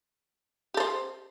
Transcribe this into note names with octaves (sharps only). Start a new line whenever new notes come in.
G4 A4 C5